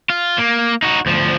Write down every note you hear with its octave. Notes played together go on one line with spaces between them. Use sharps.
F4
A#3
D#4 F#4
D2 F3